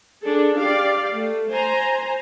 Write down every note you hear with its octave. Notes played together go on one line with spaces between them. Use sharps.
D4 G#4 A4
G4 D5 F5
A3
C5 G#5 A#5